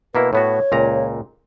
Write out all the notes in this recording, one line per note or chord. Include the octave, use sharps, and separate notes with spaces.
B2 A#3 E4 B4
A2 B3 F#4 C#5
C#2 A#2 A#5